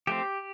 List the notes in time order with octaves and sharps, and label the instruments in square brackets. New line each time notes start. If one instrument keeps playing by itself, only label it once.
[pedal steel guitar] F3 A3 C4 G4